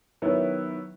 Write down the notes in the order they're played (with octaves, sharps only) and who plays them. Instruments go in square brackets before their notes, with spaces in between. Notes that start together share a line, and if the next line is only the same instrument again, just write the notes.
[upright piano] D#3 F#3 B3 E4